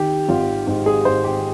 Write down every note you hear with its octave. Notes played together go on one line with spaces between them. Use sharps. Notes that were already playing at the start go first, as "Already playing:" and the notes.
Already playing: D#3 G4
G#1 F4
G#2 G4
G#4
G#2 C5
G4